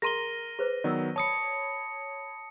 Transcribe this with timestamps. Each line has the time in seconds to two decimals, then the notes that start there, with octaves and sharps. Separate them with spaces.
0.02 G#4 A#4 A#5 C6 A#6 D#7 G7
0.59 G#4 B4 C5
0.84 D#3 F#3 B3 D5 E6
1.16 C#5 A5 B5 D#6 C#7